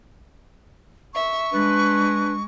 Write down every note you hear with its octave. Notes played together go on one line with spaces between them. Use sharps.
E5 C#6
G#3 D4 B4